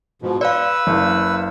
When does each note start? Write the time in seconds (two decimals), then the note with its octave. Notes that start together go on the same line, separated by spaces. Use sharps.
0.22 G#2 B2 F3
0.41 B4 D5 F5 E6
0.87 F#1